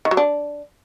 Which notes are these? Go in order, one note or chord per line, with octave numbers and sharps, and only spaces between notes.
D#3
F#3
D4